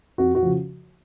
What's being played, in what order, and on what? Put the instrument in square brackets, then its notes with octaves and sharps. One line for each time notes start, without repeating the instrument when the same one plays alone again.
[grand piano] F2 F#4
F#4
C#3 F3